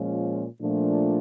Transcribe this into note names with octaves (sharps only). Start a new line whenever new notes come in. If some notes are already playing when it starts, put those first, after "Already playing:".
Already playing: A#2 F3 G#3 C#4 F4
A#2 F3 A3 D4